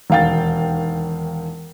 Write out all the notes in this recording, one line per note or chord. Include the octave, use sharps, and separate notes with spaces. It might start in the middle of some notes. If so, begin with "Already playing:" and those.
E1 D#2 F5 G5 A6